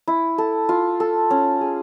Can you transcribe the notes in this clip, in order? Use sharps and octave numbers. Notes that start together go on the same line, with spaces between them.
E4
A4
F4
A4
C#4
G#4